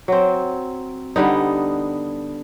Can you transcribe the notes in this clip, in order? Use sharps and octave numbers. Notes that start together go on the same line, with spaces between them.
F#3 C4
D3 G3 B3 D#4